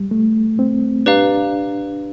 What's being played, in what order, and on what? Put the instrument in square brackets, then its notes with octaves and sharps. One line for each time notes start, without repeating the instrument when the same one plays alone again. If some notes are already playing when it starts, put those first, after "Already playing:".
Already playing: [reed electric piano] G3
A3
C4
[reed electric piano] D4 [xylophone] G4 B4 D5 F5 A#5